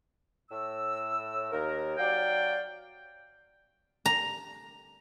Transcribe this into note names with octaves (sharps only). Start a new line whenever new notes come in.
A2 E6
D#2 A#4
F#3 D5 F5 G5
A#5